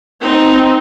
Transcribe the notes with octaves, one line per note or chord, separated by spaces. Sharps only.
C4 D#4